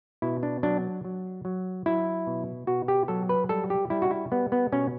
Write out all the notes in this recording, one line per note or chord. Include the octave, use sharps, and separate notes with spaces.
B2 E4
D4
F#3 D4
F#3
F#3
F#3 E4
B2
B2 F#4
G4
F#3 A4
B4
G3 A4
G4
G3 E4
F#4
E4
G3 B3
B3
B2 C#4